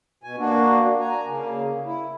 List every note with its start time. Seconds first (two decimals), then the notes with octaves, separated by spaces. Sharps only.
0.23 B2 G#5
0.38 A#3 D4 F#4
1.00 G#5 A#5
1.27 C#3 A#3
1.85 E4